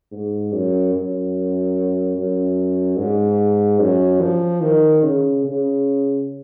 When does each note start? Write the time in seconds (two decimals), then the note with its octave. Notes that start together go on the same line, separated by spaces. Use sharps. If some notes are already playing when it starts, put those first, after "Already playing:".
0.11 G#2
0.53 F#2
0.94 F#2
2.16 F#2
2.98 G#2
3.80 F#2
4.21 F3
4.61 D#3
5.03 C#3
5.44 C#3